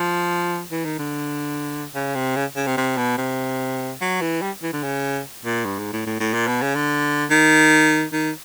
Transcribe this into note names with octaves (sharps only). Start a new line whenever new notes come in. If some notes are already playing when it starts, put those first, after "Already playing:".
Already playing: F3
E3
D#3
D3
C#3
C3
C#3
C#3
C3
C3
B2
C3
F#3
E3
G3
E3
D3
C#3
A#2
G2
G#2
A2
A2
A2
A#2
B2
C#3
D3
D#3
D#3